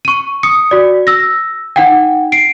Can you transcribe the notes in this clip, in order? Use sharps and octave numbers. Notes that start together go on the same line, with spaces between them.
C#6 D#7
D#6 C#7
F#4 D5
E6 A#6
D#4 F#5 G5
C7 D7